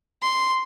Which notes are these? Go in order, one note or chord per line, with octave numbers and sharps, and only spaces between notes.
C6